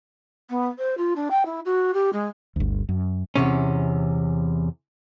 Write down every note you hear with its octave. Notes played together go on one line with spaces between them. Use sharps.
B3
C5
F4
D4
G5
E4
F#4
G4
G#3
G1 D2
F#2
E2 C3 C#4